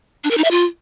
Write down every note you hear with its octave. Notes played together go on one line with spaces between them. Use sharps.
D4
A#4
D#4
E5
F4